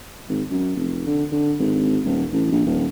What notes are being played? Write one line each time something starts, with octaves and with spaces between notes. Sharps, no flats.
G#1
F#2
F1
D3
D3
G#1
D#1
A1
A#1
D#1